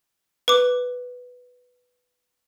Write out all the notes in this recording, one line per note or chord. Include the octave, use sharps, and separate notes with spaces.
B4 D6